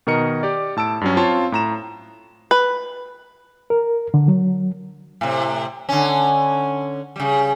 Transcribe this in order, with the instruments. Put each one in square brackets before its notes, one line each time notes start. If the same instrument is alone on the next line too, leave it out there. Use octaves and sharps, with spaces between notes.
[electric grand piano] B2 D#3 A#4 D#5 C#7
G4 D5
A2 A5 E6 D7
G2 F#3 C#4
C4 F4 C#5 F5 A5
A2 A#5 E7
[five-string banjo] B4
[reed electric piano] A#4
D3
F#3
[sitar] A2 C3
D3 C#4
C#3 G3